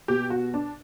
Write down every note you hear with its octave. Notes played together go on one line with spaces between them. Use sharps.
B2 G4
F#4
D4